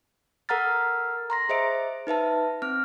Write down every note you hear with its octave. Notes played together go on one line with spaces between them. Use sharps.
A4 A#4 F#5 A#5 F6 A6
A#5 C6 A#6
G#4 C5 D#5 E5 D7
D#4 B4 E5 A5
C4 F6